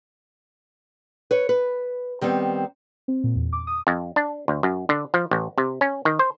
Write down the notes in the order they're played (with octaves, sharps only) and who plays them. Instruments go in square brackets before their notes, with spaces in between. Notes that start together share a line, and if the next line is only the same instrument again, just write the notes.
[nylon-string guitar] B4 C#5
B4
D#3 G3 B3 C4
[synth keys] C4
A#2
E2
D6
D#6
[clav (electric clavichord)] F2
D4
D2
F#2
D3
F3
A1
C3
C#4
D#3
C5